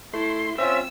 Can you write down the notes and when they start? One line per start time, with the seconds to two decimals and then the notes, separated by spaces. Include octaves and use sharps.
0.13 A3 E4 C6
0.58 C4 C#4 F4 E5 E6